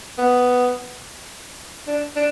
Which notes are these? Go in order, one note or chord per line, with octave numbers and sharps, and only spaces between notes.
B3
D4
D4